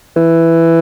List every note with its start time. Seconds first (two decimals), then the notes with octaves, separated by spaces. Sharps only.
0.16 E3